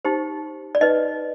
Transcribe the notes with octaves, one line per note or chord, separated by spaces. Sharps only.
D#4 G4 C5
D5
D#4 B4 D#5